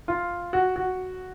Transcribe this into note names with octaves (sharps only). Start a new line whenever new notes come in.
F4
F#4
F#4